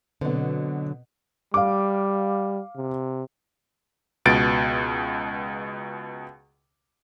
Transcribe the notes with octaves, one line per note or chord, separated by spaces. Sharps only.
B2 D3 F#3 B3 C4
G3 F5 D6
C3
C#2 B2 A6 D7